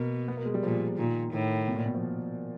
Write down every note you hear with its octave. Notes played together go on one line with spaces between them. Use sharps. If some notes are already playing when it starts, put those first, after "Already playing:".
Already playing: B2 A#3
B3
A#3
G#3
G3
A#2 F3
A#2 D#3
A2 D#3
B2
A#2
B2
F3